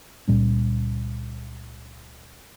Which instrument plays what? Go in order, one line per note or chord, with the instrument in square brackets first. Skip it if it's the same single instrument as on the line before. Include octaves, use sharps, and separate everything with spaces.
[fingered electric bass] C#2 A#2 G3 C#4